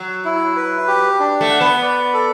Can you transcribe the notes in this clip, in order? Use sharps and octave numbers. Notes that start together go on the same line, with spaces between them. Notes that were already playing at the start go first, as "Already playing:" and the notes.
Already playing: F#3
E4
B4
G4
D4
A3
F#5
B3
D5
A4